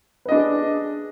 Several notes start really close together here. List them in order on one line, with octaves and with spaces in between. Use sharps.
B4 D#5 D4 G#4